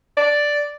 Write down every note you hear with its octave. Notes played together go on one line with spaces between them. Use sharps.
D5